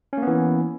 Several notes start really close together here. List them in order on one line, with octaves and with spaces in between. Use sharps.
C#4 A#3 B3 E3